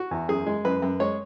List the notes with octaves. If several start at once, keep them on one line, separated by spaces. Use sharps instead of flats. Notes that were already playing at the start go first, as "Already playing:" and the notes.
Already playing: F#4
E2
F#2 G#4
G#3
F#2 B4
F#2
G#3 C#5